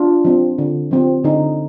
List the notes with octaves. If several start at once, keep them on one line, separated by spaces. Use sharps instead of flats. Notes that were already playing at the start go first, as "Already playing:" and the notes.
Already playing: D4 F4
F3 C4
D3
F3 C4
D3 D#4